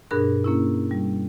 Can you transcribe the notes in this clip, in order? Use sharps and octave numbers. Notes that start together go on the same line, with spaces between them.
G2 B2 D4 G#4 A#4 F#6
A#3 C#4 E4
G3